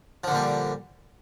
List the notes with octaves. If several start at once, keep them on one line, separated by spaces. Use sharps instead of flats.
A#2 D3 F3 G3